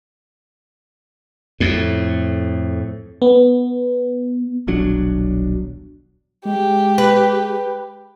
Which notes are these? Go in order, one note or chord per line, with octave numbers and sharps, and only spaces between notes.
F2 A2
B3
D#1 B1 F#3 D4
G#3 G4
B4